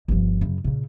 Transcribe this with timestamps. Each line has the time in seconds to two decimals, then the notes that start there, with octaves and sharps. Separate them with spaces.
0.08 G1 F3
0.41 F#2 C#3
0.64 A#2 C#3